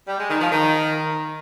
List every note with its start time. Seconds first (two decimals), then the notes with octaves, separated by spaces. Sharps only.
0.08 G3
0.19 G#3
0.30 D#3
0.41 F3
0.52 D#3